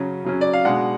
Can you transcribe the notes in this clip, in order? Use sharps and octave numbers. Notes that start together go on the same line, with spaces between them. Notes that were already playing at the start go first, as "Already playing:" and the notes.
Already playing: C#3 F#3 C#4
C#3 F#3 C#4
D5
F5
B2 G#3 D4 F#5